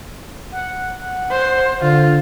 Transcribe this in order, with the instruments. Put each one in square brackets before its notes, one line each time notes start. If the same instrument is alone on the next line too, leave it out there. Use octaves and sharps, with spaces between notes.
[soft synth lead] F#5
[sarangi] C5
[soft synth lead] D3 [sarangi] F4